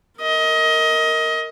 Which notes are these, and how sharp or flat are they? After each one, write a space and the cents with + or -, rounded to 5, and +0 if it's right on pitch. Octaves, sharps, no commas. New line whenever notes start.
A#4 -15 D#5 +25